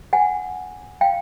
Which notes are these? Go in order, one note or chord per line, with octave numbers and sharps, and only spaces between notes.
F#5 G#5
F5 G5